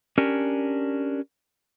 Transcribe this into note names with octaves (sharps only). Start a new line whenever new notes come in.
C#4 D4 G4 A#4